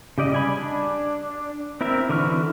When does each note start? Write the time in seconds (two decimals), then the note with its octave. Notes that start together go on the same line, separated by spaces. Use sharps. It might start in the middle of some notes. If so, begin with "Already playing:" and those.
0.18 C#3 G4 D5 D#5
0.33 G3 G#5 B5
0.57 D4
1.81 C4 E4 A#4 E5
2.09 D3 E3 F#4 C#6 F6